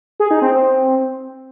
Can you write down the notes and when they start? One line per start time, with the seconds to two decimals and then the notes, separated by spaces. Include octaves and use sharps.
0.20 G#4
0.31 D#4
0.42 C4
0.53 C4